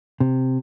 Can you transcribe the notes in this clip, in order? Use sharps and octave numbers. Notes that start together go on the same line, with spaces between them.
C3